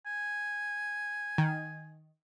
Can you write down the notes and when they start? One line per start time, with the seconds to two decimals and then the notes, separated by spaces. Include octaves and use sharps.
0.06 G#5
1.38 D#3